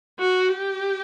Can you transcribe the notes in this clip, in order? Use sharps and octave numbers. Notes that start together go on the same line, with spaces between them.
F#4
G4